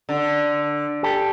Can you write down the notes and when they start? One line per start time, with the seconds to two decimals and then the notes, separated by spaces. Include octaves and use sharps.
0.09 D3
1.03 G4 A4